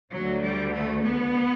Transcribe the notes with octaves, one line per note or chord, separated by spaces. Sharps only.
D2 D3 F#3
G3
A3
B3